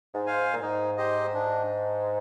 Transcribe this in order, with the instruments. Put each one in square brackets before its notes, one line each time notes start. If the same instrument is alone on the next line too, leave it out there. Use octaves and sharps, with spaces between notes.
[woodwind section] G#2
[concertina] C5 F5 G#5
[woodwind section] A#2
[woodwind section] G#2 [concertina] D#4
[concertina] G4 C5 D#5
[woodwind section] G#2 [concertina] D4